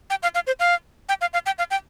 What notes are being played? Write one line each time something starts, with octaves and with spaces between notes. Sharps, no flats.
G5
F5
F5
C5
F5
G5
F5
F5
G5
F5
G5